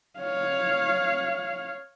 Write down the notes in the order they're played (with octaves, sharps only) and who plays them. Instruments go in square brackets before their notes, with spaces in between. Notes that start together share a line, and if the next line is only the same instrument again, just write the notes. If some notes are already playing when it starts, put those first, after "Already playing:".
[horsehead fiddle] C#5 F5